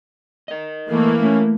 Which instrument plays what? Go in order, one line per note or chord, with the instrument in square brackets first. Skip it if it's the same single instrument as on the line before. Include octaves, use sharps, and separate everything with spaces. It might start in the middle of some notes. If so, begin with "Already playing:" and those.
[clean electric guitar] A#4 D#5
[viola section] E3 A#3 [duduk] A3
[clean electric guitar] A3 [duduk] C#4